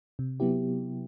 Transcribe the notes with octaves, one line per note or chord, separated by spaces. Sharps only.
C3
F#3 B3 E4 G4